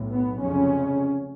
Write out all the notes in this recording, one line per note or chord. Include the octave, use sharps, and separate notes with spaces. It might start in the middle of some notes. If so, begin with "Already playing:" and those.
Already playing: B1 A2
B3
F1 F2 C#3 C#4